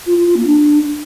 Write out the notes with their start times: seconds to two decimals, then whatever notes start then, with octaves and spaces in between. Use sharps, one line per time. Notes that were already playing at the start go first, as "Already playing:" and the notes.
0.06 F4
0.16 F4
0.26 F4
0.36 A#3
0.46 D4